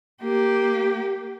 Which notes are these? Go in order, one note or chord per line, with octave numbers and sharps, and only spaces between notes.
A#3 G4